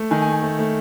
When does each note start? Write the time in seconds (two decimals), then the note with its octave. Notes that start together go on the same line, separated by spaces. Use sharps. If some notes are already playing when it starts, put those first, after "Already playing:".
Already playing: A3
0.10 D#3 G#5
0.22 G#5
0.27 A3
0.32 G#5
0.42 A3
0.59 A3